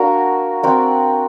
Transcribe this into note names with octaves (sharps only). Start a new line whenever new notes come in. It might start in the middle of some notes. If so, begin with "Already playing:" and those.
Already playing: A#3 D4 F#4 A#4
C4 F#4 A#4 D5